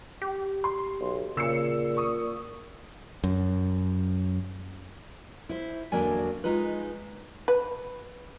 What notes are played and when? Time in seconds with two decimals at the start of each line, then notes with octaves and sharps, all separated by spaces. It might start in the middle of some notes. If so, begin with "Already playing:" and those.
0.22 G4
0.64 C6
1.00 B1
1.37 A#2 C#3 E6 C7 C#7
1.97 C#6 D#6
3.24 F#2
5.49 E4 C5
5.92 E2 D3 F#3 A#3 D4 G#5
6.44 G#3 D#4 F4 B4
7.48 B4